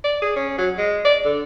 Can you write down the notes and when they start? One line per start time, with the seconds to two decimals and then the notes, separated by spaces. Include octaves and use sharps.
0.04 D5
0.22 G#4
0.36 C#4
0.58 F#3
0.78 G#3
1.05 D5
1.25 D3